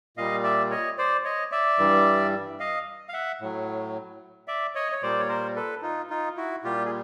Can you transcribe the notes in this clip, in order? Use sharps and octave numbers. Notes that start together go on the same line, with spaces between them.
A#2 G3 D#5 F5
D5 E5
C#5 D#5
C5 D5
C#5 D#5
D5 E5
G2 E3 G3
D#5 F5
F5
E5 F#5
A2 F#3
D5 E5
C#5 D#5
C#5
A#2 G3 C5 D5
C#5
A#4 C5
A4 B4
D#4 F4
D#4 F4
E4 F#4
A#2 G3 F4 G4
G#4